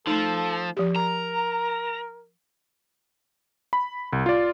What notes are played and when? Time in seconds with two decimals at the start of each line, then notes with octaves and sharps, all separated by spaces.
0.07 F3 A3 D#4 A4
0.77 F3 G4
0.96 A#4 A#5
3.73 B5
4.13 C2
4.26 F4 D5